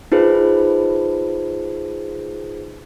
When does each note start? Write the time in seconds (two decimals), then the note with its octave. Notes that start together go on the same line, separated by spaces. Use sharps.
0.12 D#4 F4 G#4 B4 C5